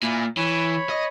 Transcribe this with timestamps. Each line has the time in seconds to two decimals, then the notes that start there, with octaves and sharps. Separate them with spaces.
0.03 A#2 E4 G#5 D6
0.37 E3 C#5 B5
0.89 D#5